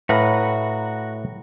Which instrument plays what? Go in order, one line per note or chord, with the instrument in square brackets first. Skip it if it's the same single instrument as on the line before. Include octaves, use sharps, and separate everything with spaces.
[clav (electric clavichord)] A2 B4 F5 [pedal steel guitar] F#4 F#5 A#5